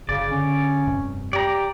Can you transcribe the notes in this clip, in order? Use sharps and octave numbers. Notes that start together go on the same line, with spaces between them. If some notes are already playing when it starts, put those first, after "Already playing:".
F#1 C#3 D5
D3 C#4
F1 G2 C3
G4 D5 A#5